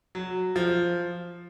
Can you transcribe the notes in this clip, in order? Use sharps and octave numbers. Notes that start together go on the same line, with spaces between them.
F#3
F3